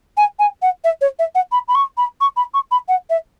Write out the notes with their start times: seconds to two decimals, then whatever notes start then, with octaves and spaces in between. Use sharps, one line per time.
0.17 G#5
0.39 G#5
0.62 F#5
0.84 E5
1.01 C#5
1.19 E5
1.35 F#5
1.52 B5
1.68 B5
1.75 C#6
1.97 B5
2.21 C#6
2.36 B5
2.54 C#6
2.71 B5
2.88 F#5
3.10 E5